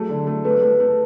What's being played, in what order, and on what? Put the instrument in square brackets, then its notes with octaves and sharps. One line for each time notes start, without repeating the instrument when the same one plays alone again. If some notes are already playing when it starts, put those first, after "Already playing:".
Already playing: [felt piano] F#3 A3 [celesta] G#4
[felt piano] D3
A3
[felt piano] A3 [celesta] B4
[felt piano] A3
A3